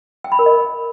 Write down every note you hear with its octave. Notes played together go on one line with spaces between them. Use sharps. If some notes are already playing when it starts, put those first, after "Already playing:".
G5
B5
A#4
D#5